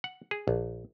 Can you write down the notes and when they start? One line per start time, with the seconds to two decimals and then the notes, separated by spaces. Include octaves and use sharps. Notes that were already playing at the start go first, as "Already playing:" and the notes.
0.04 F#5
0.31 G#4
0.48 A#1